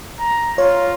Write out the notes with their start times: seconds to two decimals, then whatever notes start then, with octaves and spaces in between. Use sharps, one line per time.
0.20 A#5
0.58 F4 C#5